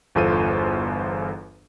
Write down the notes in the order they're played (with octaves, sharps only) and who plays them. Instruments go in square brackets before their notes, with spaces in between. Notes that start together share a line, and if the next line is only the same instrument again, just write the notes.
[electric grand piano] G1 E2 F4 A4 C5 D#7